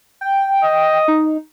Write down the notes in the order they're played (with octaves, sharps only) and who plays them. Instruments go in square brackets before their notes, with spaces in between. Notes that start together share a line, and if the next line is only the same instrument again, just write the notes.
[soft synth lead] G5
[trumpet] D#5
[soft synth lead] D#4